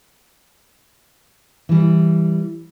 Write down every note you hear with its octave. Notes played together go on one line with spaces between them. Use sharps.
E3 G3